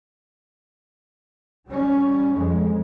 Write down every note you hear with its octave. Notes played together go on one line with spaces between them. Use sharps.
G3 C#4
F2 G#3